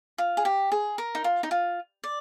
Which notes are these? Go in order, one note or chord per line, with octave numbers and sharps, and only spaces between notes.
F4
G#4
G4
G#4
A#4
D#4
F4
D#4
F4
D5